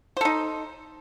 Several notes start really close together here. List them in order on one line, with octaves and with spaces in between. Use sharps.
C5 A4 D#4